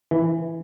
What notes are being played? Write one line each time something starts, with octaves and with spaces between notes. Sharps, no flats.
E3